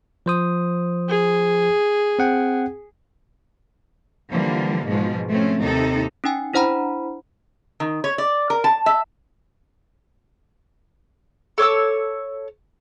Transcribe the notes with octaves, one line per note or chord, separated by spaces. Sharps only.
F3 C5 D#6
G#4
C4 F#5 G5
D3 E3 F3 G3 A#3
G#2 B2 F3 G#3
F3 A3 C4 C#4
D#2 C3 D#4 A4
C#4 D#4 G5 G#5
D4 E4 C5 F#5 A#5 B5
D#3
C#5
D5
A#4
A5
E5
A4 C#5 D6 E6